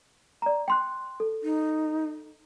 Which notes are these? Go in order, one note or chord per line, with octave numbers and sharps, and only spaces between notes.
D5 A#5
G5 C6 F#6
A4
D#4